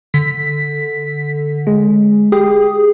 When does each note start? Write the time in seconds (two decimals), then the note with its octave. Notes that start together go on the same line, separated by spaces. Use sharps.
0.14 D3 B6
1.67 G#3
2.32 G4 G#4